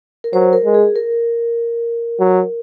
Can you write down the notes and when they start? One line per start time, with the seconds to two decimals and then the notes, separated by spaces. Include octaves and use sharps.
0.24 A#4
0.33 F#3 C5
0.53 A#4
0.64 G#3
0.74 G#4
0.96 A#4
2.20 F#3